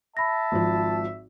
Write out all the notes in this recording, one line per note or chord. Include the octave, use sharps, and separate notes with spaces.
E5 A5 B5 A#6
G#1 F3